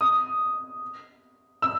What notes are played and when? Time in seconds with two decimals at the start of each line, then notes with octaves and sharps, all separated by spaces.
0.01 D#6
1.62 E6